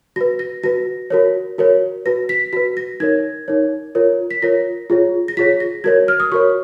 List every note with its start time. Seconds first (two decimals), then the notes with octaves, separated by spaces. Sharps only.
0.16 F#4 B4 A#6
0.39 A#6
0.64 F#4 B4 A#6
1.10 F#4 A#4 C#5
1.58 F#4 A#4 C#5
2.05 F#4 B4 A#6
2.29 B6
2.53 F#4 B4 B6
2.77 A#6
3.00 D#4 A#4 C#5 G#6
3.48 D#4 A#4 C#5
3.95 F4 A#4 C#5
4.31 B6
4.42 F4 A#4 C#5 A#6
4.90 F4 G#4 C#5
5.28 A#6
5.37 F4 G#4 C#5 B6
5.60 A#6
5.84 F#4 A#4 C#5 G#6
6.08 F6
6.20 D#6
6.32 F#4 A#4 C#5 C#6